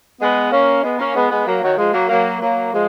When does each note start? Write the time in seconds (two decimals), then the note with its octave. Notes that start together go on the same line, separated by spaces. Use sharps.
0.20 G#3 B3
0.51 A#3 C#4
0.82 G#3 B3
0.98 A#3 C#4
1.14 G#3 B3
1.30 G#3 B3
1.46 F#3 A#3
1.62 D#3 F#3
1.77 F3 G#3
1.93 F#3 A#3
2.09 F#3 A#3
2.40 F#3 A#3
2.72 F3 G#3